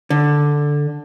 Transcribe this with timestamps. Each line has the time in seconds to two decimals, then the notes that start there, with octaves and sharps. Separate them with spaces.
0.10 D3